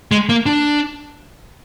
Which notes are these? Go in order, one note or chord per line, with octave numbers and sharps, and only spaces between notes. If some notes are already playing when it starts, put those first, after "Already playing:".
G#3
A#3
D4